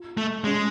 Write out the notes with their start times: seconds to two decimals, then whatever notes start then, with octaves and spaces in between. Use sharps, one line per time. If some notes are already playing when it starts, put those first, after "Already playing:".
Already playing: F4
0.17 A3
0.44 G#3 C#4